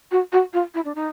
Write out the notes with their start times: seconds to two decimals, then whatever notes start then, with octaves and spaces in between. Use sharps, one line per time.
0.11 F#4
0.32 F#4
0.53 F4
0.74 E4
0.85 D4
0.95 D#4